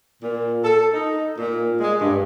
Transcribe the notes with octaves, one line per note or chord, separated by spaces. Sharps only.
A#2
A4
D#4
A#2
G#3
G2